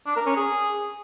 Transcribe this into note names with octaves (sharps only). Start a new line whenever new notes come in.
D4
A#4
C#4
G#4